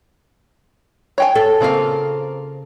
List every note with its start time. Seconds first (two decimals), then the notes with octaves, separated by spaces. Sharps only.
1.18 C#5 G5 G#5
1.35 A4
1.61 C#3 A#3 C4 F4 F5